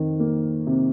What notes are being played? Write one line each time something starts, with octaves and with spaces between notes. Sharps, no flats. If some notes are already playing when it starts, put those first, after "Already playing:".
Already playing: F2 D#3
A#3
C3